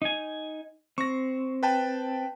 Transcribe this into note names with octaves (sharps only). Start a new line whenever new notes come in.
D#4 G#5
C4 C#6 A#6
B4 G5 A5